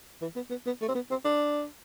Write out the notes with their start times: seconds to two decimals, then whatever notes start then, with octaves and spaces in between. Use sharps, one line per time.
0.22 E3
0.36 B3
0.50 B3
0.66 B3
0.81 A3
0.88 C4
0.95 B3
1.11 C4
1.25 D4